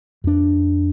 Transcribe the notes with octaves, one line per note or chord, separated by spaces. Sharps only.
F2 D4